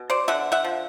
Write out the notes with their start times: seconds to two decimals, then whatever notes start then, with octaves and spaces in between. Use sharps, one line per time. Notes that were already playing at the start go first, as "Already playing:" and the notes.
Already playing: B2
0.10 C5 D5
0.28 D3 E5 F#5
0.52 E5 F#5
0.64 F3